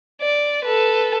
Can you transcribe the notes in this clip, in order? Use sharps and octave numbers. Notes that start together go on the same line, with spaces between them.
D5
A4 B4